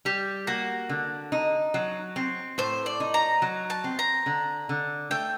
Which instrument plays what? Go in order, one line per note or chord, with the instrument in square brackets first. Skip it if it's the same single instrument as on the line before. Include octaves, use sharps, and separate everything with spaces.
[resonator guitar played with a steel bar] G3 [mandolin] G4
[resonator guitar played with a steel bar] A#3 [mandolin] F#4
[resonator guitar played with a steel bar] D3
D#4
F#3
C4
[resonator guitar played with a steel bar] A2 [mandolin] C5
[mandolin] D5
[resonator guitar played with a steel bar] D#4
[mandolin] A#5
[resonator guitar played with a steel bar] F#3
[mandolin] A5
[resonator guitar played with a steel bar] C4
[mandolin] A#5
[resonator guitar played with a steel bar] D3
D3
[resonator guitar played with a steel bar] A3 [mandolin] G5